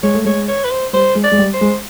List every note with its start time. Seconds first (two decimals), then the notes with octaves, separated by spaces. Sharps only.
0.03 G#3 C#5
0.14 A3
0.25 G#3 C#5
0.48 C#5
0.64 B4
0.71 C5
0.93 G3 C5
1.15 G#3
1.24 D5
1.32 G#3
1.38 G3
1.53 C5
1.61 G#3